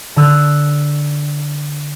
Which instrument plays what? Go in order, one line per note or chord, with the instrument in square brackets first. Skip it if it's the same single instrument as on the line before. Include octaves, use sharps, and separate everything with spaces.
[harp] D3 E6 F#6